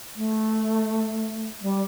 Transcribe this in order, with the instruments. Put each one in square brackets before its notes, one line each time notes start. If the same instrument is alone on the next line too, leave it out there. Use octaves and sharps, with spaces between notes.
[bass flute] A3
G3